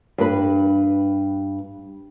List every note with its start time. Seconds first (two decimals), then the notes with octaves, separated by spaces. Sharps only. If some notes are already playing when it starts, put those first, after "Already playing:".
0.18 G2 B4